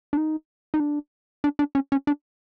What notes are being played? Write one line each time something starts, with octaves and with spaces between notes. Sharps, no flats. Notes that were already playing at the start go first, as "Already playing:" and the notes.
D4
D#4
D#4
D4
D4
D4
C#4
C#4
D4